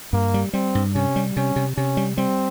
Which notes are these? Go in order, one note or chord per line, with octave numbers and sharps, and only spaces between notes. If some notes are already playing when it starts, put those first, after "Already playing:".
G2 A#3
G3
G3 C4
G2
C3 C#4
G3
C3 C#4
C3
C3 C#4
G3
G3 C4